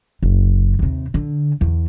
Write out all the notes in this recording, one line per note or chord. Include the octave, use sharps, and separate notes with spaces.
F#1
D#2 C3
D3
E2